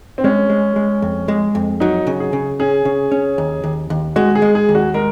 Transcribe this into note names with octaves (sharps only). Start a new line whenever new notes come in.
C4
G#3 C#4
G#3
G#3
F2
G#3
F2
F#3 D#4
C#3
G#4
C#3
C#4 G#4
C#3
C#4
D#2
D#2
D#2
G#3 F#4
G#4
G#3
G#4
D#2
F#4
G#3 A#4